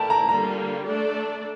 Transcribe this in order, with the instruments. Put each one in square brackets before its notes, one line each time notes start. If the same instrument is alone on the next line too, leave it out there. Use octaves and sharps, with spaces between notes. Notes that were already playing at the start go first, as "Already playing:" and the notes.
Already playing: [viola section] A3 E4 A#4 D5 [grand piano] G5 A5
[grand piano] A#5
[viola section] D3 G3 A#3 F4 [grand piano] A#5
[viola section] A3 D4 A4 D5